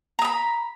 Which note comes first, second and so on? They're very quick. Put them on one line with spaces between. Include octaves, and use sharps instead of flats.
A#5 D#6 B5